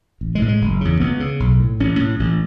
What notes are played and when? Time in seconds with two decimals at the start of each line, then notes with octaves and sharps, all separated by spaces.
0.21 A1
0.35 G#3
0.42 A2
0.48 G#3
0.61 F#1
0.81 E2 C#3
1.00 C#2 B3
1.20 C#3
1.40 B1
1.60 A2
1.80 A1 C#4
2.00 A2
2.20 A1